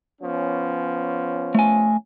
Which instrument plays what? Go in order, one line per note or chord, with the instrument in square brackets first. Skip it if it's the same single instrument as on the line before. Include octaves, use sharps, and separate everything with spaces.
[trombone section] F3 B3 C#4
[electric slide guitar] A3 G#5